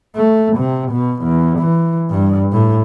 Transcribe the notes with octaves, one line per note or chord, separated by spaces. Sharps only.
A3
C3
B2
E2
E3
G2
A2